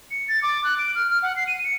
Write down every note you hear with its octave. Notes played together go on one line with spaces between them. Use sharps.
C#7
A6
D6
F#6
D7
F6
F6
F#5
C7
D#7
C#7